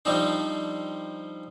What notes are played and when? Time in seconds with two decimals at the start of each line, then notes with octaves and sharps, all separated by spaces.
0.05 F3 G3 C4 D4 D#4 C5